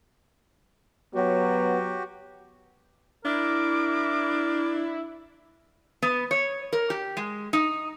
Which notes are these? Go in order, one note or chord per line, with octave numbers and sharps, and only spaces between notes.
F#3 B3 F#4 G4
D4 E4 A#4 D6
B3
C#5
A#4
G4
G#3
D#4